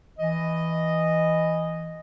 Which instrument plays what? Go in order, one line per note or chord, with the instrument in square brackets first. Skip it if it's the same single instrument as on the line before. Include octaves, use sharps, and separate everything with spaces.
[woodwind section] E3 D#5